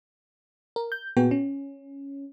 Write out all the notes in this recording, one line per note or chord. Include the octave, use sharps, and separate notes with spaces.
A#4
G6
A#2 B3 F#4 G#4 G5
C#4